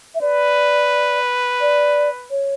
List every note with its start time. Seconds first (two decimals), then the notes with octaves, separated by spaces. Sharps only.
0.15 E5
0.21 B4 D5
1.61 D5
2.31 C#5